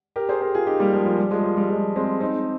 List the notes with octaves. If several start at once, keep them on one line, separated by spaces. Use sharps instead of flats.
G4 A#4
G#4 C5
G4 A#4
F4 G#4
D#4 G4
G3 A#3
F3 G#3
F3
G3
F3 G#3
F3
G3
F3 G#3
G#3 C4
C4 D#4